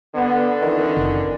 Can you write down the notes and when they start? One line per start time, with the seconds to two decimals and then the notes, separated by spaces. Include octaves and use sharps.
0.15 D3 B3
0.62 F2 D#3 E3
0.97 F#1